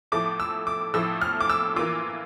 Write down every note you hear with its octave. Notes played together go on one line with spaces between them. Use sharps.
A2 F3 A3 E4 D6
E6
D6
A2 F3 A3 E4 E6
F6
D6
E6
E3 A#3 F4 D6